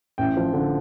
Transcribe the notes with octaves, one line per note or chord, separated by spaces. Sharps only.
A1 G5
F3
D3